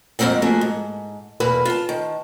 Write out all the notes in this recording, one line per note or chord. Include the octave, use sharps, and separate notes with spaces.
F2 G#2 B2 A#3 C4 F#5
F3 A3 A#3 F#4 G#4
G#2
E2 B2 A#3 B4
F4 A5
D#3